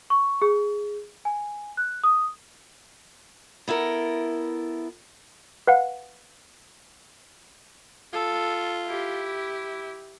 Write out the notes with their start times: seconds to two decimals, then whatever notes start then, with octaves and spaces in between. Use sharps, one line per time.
0.10 C#6
0.42 G#4
1.25 G#5
1.77 F#6
2.04 D#6
3.68 B3 E4 A4 A#4
5.67 B4 F5 F#5
8.13 F4 A4
8.86 E4 G4